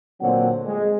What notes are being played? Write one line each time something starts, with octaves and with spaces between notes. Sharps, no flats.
A#2 D3 F#3 C4 C5 F#5
G#3